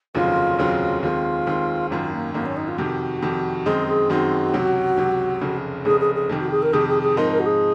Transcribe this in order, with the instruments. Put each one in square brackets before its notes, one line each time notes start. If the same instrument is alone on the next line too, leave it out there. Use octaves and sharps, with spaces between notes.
[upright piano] F1 D#2 C#3 F#3 C4 [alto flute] F4
[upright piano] F1 D#2 C#3 F#3 C4
[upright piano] D#2 D#3 G#3 C4 [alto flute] F4
[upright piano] D#2 D#3 G#3 C4
[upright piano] G#1 F#2 D#3 [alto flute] F4
[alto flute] A#3
[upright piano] G#1 F#2 D#3 [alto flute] A#3
[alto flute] C#4
D#4
F4
[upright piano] F2 C3 D#3 [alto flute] F#4
[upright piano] F2 C3 D#3
[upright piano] F#2 D#3 G#3 C4 D#4 [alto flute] G#4
[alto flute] G#4
[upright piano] F#2 D#3 G#3 C4 D#4 [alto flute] F#4
[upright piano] C#2 C3 F#3
C#2 C3 F#3
F1 F2 C#3
[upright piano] F1 F2 C#3 [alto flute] G#4
[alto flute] G#4
G#4
[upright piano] F2 C3 D#3
[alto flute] F#4
G#4
A#4
[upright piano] F2 C3 D#3 [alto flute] G#4
[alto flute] G#4
G#4
[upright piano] G#2 F3 C4 D#4 [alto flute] A#4
[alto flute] A#4
F#4
G#4